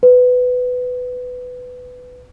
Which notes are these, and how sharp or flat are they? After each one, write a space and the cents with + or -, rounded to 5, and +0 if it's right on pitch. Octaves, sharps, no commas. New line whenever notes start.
B4 +15